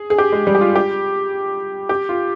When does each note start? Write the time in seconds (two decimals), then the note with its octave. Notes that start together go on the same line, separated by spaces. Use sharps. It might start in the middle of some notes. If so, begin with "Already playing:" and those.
Already playing: G#4
0.10 G#4
0.18 G4
0.32 G#3
0.47 G3
0.55 G4
0.61 F4
0.76 G4
1.89 G4
2.09 F4